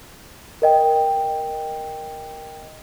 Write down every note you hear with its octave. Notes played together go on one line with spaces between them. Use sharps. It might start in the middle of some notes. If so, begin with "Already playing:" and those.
A#4 D#5 G5